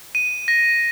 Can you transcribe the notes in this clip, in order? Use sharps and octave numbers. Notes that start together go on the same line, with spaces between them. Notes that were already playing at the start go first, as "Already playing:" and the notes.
D#7
A#6